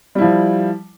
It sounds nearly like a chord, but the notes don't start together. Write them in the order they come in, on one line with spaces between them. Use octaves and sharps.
G3 E4 F3